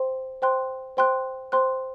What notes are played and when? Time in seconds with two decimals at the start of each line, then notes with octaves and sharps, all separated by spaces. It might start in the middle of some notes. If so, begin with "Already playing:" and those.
Already playing: C5 G5 C6
0.42 C5 G5 C6 F#6
0.97 C5 G5 C6 F#6
1.52 C5 G5 C6 F#6